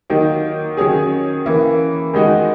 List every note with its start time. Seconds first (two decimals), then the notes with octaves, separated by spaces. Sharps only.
0.10 D#3 F#3 A#3 D#4
0.77 D#3 F#3 C#4 G#4
1.46 E3 A#3 C#4
2.14 D#3 G#3 D#4 F#4